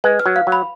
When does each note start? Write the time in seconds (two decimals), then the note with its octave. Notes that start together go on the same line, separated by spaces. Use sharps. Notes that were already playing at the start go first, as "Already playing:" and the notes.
0.04 G#3 B4
0.19 F6
0.26 F#3
0.36 F5
0.47 F#3
0.52 B5